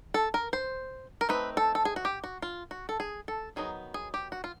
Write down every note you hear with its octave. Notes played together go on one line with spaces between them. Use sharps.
A4
A#4
C5
A#4
A3 C4 D#4 B4
A4
A4
G#4
F#4
G4
F#4
F4
F#4
A4
G#4
A4
D#3 F#3 B3 D#4 G#4
G#4
G4
F#4
F4